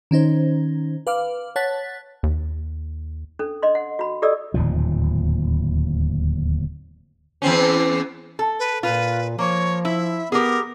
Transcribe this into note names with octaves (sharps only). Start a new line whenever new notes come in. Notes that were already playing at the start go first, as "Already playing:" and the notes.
D#3 C#4 D#4 C5
B4 F5 D6 F6
C#5 F#5 A5 F#6 A6 B6
D#2
C#4 D4 A4
D4 D#5 C6
F#5
F#4 B5
G4 A4 D5 D#5 E6
D1 D#2 A#2 F3
E2 C4 C#4
A4
B4
A#2 F4 B4
F3 A#3 C#5
E4 E5
B3 G4 G#4 A#4